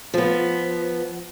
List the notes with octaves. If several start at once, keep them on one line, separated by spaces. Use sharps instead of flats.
F3 B3